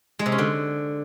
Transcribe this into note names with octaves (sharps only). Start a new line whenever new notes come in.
G#3
C3
C#4
D3